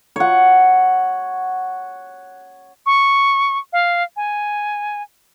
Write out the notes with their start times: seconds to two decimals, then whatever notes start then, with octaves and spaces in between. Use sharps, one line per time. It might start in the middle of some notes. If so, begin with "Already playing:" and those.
0.16 C#5 F#5
2.86 C#6
3.73 F5
4.17 G#5